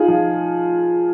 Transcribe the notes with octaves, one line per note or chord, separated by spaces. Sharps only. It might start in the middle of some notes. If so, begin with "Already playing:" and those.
Already playing: D#4 F4 G#4
F3